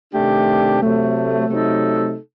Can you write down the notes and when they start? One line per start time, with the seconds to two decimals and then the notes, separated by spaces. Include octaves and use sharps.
0.13 C3 D#3 A3 D4 G4
0.82 C3 F#3 A3
1.49 C3 F#3 A3 D#4 A4